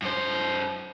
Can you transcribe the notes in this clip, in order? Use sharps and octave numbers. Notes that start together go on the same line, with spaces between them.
F#2 C5